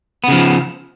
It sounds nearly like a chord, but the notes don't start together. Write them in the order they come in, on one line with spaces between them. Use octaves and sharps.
B3 C#3 F3